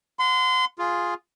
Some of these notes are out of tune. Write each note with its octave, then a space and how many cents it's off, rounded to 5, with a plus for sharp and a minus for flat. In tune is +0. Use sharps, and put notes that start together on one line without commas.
F#5 -35 C6 -30
F4 +0 G#4 +0